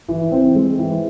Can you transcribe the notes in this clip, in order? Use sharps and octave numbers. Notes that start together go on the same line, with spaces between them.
E3
C4
G#3
E3